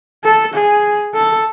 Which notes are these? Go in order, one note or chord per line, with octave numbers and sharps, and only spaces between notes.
A4
G#4
A4